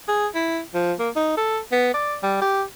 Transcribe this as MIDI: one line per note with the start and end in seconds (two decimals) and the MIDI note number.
0.08 0.27 68
0.35 0.61 64
0.74 0.93 53
0.99 1.10 58
1.16 1.34 63
1.37 1.59 69
1.72 1.92 59
1.94 2.16 74
2.23 2.37 55
2.42 2.63 67